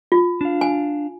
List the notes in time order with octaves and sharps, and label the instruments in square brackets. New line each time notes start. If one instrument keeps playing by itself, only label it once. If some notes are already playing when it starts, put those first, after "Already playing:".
[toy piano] F4
[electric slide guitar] D4 F5
[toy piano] G#5